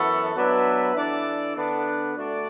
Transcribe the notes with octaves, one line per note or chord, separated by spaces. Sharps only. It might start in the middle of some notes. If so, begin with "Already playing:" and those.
Already playing: F#2 E3 B3 F#4 A4
F#3 B3 D4 B4 E5
E3 D4 A4 D5
D3 B3 D4
D3 A3 D4 F#4 D5